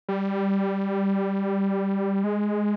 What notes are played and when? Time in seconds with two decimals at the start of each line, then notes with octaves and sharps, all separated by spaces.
0.09 G3
2.24 G#3